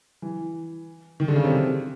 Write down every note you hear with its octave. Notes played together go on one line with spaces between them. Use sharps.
E3
D#3
D3
C#3
C3